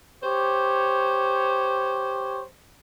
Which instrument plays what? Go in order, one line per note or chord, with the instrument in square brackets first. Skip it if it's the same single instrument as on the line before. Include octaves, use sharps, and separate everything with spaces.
[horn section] G4 C5 C#5